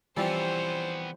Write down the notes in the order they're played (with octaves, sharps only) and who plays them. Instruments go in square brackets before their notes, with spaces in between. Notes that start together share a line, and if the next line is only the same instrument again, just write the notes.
[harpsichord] E3 C4 [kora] F3 G3 E4 [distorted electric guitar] B3 C#5 [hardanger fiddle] C5